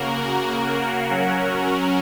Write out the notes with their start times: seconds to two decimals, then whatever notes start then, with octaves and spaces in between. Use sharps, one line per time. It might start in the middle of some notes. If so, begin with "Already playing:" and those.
Already playing: C#3 A#3 F#4 A#4
1.09 F#3 C#4 F#4 A#4